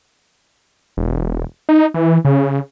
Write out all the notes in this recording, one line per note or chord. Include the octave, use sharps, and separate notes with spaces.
E1
D#4
E3
C#3